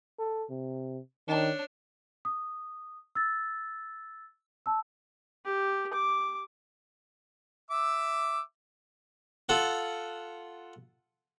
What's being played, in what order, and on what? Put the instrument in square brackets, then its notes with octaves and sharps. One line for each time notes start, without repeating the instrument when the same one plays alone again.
[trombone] A4
C3
[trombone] D#3 [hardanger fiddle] D4 C#5
[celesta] D#6
E6 A6
A5 E6
[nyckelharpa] G4
D6
[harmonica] E5 D6 E6
[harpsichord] F4 A4 F#5